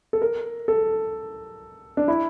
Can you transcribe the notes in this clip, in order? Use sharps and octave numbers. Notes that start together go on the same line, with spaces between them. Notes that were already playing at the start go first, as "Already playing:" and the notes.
A4
A#4
A4
D4
E4